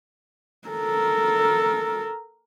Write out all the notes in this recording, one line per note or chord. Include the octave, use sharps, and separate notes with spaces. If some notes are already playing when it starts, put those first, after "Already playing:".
A4 A#4